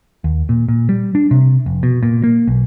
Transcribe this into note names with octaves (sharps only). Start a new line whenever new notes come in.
D#2
A#2
A#2
G3
D4
C3
F1
B2
A#2
A#3
B1